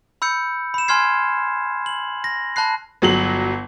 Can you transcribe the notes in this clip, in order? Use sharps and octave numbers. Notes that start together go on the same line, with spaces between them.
B5 E6 G6 C#7
B5 E7
G#5 C6 F6 G#6 C7
F#7
A#6
A5 B5 F#6 C7
G1 F#3 F#7